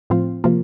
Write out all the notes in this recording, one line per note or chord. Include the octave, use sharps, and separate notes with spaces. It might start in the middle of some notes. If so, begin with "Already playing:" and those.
A2 F3 C4 F4
C3 F3 A#3 F4